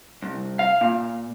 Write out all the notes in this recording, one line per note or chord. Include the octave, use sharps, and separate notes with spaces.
C2
F5
A#2